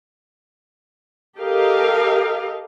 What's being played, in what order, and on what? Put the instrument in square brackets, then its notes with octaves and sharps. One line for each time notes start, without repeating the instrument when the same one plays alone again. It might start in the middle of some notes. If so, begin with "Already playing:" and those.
[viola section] G4 A4 A#4 D#5 F5